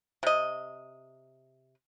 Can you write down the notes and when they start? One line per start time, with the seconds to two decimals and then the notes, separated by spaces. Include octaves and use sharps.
0.23 C3 D#5